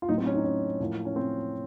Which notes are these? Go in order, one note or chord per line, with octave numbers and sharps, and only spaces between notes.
F4
A2 F#3 A3 D#4
C4
C#4
D#4
C#4
A2 F3 A#3
C#4
C4